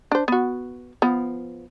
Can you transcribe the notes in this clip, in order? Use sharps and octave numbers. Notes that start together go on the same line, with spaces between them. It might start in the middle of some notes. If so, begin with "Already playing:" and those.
D4 C5
B3 F#4
F3 B3